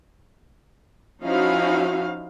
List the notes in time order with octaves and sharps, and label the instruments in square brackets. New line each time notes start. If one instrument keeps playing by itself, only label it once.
[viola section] F3 C#4 D#4 E4 F#4 F5